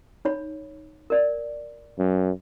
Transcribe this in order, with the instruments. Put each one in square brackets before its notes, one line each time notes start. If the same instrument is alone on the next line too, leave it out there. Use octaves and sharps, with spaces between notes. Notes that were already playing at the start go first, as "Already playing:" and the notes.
[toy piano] D#4 C#5 B5
A#4 D5
[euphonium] F#2